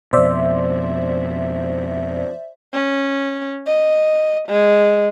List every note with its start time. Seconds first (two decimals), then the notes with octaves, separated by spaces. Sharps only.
0.13 F2 B2 C5 D5 E5
2.73 C#4
3.67 D#5
4.48 G#3